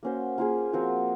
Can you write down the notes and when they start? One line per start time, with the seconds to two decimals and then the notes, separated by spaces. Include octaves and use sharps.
0.03 A#3 C#4 F#4 C5
0.38 A#3 F4 G#4
0.73 F3 C4 F#4 A#4